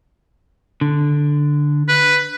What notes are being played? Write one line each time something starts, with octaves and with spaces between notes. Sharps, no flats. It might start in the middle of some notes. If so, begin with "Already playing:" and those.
D3
B4